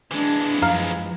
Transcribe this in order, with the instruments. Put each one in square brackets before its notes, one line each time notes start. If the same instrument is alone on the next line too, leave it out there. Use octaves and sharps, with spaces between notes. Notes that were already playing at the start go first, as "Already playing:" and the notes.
[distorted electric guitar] E3 G#3 [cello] D4
[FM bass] F#2 [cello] F3 [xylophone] F5 A#5 F6